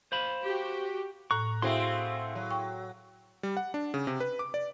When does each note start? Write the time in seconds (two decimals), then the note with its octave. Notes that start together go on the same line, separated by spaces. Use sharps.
0.12 C5 F5 B5
0.43 F#4 G4
1.31 A2 A#5 C#6 F#6
1.62 A3 C4 E4 F#4 G#4 F5 C6
2.35 F#3
2.51 G5 C#6
3.43 G3
3.57 F#5
3.74 D4
3.94 C#3
4.07 C3
4.20 B4
4.39 D6
4.54 D5